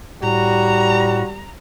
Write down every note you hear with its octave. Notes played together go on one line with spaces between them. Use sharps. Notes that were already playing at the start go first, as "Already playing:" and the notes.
A2 G3 F#4 A#5